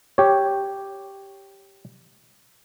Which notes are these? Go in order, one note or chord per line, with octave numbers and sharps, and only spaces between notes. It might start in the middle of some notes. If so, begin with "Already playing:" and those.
G4 C#5